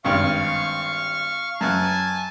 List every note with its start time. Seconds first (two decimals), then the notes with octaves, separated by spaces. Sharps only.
0.05 G#1 G2 F5 C#6 F6
1.61 F#2 G#5 A5 F6 F#6